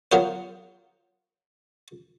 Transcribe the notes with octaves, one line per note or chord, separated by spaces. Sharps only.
F#3 B3 F4 A#4 C5